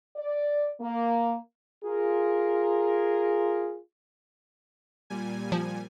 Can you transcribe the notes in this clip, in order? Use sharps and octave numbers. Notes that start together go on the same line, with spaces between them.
D5
A#3
F4 G#4 A#4
A#2 G3 G#5
F3